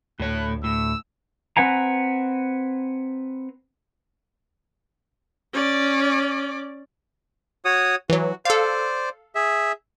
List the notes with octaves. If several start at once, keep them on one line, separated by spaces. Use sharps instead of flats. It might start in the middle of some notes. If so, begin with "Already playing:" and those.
D2 A2 C#5 F#6
A2 E6
C4 B4 F#5 G#5 A#5
C#4 D5
F#4 C#5 D#6
E3 F#3 F#4
A4 C5 D5 F5
G#4 E5